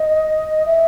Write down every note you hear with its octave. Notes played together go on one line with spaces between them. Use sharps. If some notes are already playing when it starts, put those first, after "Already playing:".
Already playing: D#5
E5